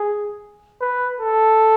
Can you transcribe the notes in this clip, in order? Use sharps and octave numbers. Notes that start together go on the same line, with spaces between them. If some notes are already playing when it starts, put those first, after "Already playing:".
Already playing: G#4
B4
A4